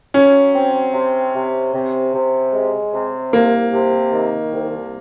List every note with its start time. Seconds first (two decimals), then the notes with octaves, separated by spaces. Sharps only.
0.14 F#3 C#4
0.55 C4
0.94 C3
1.34 C3
1.74 C3
2.14 C3
2.53 G#3
2.93 C3
3.32 C2 A#3
3.72 C3
4.12 D#3
4.52 C2